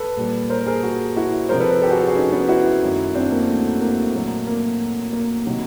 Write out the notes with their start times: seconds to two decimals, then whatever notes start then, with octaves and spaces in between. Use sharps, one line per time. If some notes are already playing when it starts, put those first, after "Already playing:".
Already playing: A4 B4
0.17 A#2 G3
0.50 A#4 C5
0.66 G#4 A#4
0.83 F#4 G#4
1.16 E4 F#4
1.49 C3 F3 G#3 A#4 C5
1.60 A4 B4
1.71 A4 B4
1.82 G4 A4
1.90 F#4 G#4
1.99 G4 A4
2.07 F#4 G#4
2.15 C#4 D#4
2.31 B3 C#4
2.49 E4 F#4
2.82 F#2 D#3 F#3 A3
3.14 C4 D4
3.31 A#3
3.48 A3
3.80 A#3
4.14 A#2 F#3 A3
4.47 A#3
5.13 A#3
5.46 C3 D#3 F#3